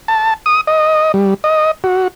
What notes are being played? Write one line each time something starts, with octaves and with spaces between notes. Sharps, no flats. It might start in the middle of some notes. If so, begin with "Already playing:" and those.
A5
D#6
D#5
G3
D#5
F#4